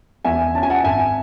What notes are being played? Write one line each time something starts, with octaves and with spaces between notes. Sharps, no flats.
E2 E5 G#5
C#4 A5
G#5
F#5 A5
G#1 E5 G#5